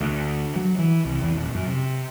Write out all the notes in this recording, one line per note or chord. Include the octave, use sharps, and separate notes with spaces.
D2
F#3
E3
C2
E2
D#1
F#2
C3